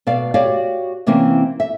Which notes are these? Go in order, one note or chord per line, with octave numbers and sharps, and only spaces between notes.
B2 D5 F5
F#4 G4 C#5 D5 F5
C3 E3 A#3 C4 C#4
E5